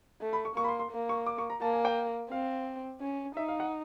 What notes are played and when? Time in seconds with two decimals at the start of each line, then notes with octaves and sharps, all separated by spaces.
0.21 A3
0.33 B5
0.45 C#6
0.56 A#3 C#6
0.64 B5
0.68 C6
0.79 C6
0.92 A#3
1.09 C#6
1.26 D6
1.38 C#6
1.50 A#5
1.61 A#3 A5
1.73 G#5
1.85 G5
2.31 C4 F5
3.01 C#4
3.36 D#4 E5
3.48 F5
3.60 F#5